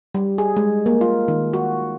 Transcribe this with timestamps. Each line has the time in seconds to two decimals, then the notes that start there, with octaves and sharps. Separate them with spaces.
0.15 G3
0.38 G#4
0.57 G#3
0.86 A#3
1.01 F4
1.28 D#3
1.53 F#4